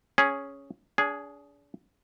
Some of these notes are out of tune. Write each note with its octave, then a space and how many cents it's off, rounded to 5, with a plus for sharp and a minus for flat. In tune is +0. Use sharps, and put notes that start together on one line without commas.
C#4 +0 G#4 +0
D4 -40 G#4 +0